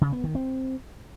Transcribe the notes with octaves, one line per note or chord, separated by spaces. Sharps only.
C#3
B3
D#3
C4